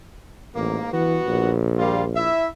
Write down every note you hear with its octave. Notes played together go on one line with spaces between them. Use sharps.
A1 G#2 A#3
G2 E3 B3 F#4
A#1
G3 A#3 F4
E4 E5